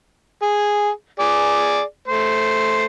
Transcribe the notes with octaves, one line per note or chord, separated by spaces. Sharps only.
G#4
G#4 D5
A3 C5